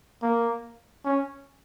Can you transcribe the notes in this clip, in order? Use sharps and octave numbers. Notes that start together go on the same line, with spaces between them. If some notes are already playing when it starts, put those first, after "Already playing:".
A#3
C#4